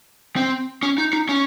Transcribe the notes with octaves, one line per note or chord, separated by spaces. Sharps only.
C4
C#4
D#4
D#4
C#4